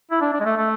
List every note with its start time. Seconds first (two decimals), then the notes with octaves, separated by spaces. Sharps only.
0.11 E4
0.21 D4
0.33 D4
0.40 G#3
0.45 A3
0.57 A3